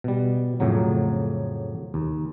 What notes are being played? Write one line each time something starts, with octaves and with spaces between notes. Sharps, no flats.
B2 G3
F2 A2 C#3 F#3
D#2